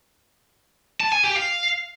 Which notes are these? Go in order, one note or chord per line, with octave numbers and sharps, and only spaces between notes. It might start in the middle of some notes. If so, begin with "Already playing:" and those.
A5
G#5
G4
F5